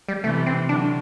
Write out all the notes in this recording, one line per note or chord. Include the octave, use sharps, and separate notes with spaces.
G3
C3 E3 A3
C4
D3 F#3 D4